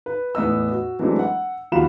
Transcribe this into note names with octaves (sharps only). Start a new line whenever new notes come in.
B4
E2 A2 B3 D#5 E6
F#4
E3 F#3 G#3 A3 C4 D4
F#5
D#2 F3 F#4 F5 B5 E7